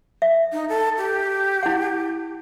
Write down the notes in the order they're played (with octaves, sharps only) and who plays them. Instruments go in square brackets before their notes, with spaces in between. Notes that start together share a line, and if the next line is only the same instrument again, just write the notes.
[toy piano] E5
[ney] D#4
A4
G4
[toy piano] E4 F#5